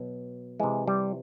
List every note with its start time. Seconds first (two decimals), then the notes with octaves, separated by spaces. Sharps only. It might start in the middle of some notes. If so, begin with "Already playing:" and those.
Already playing: B2 F#3
0.60 C3 E3 G#3
0.87 G3